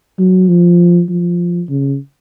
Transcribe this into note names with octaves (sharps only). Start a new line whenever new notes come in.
F#3
F3
F3
C#3